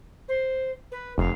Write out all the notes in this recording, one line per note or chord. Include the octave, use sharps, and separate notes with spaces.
C5
B4
F1 F5